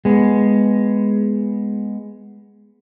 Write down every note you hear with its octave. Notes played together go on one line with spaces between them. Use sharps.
G#3 B3